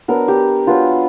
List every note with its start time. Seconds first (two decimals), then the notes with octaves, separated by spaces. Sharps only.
0.08 F#3 B3 D4 A#4
0.28 G4
0.67 F#3 B3 D4 F4